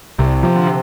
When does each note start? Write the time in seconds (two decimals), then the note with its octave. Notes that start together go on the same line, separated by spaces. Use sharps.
0.19 C2 C3
0.43 C3 F3
0.56 D3
0.67 C3